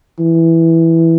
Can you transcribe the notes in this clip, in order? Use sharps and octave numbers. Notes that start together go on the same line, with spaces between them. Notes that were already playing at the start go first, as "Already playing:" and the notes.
E3